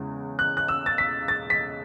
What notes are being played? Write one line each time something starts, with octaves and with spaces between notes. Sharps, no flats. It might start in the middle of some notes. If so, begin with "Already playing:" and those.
Already playing: E2 C#3 G#3
F#6
F#6
E6
A6
B6
A6
B6